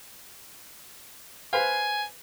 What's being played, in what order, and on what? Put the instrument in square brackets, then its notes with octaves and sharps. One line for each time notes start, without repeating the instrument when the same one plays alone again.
[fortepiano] B4 C5 F5 [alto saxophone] G#5